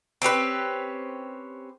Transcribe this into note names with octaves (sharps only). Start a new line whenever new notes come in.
C4 C#4 G4 B4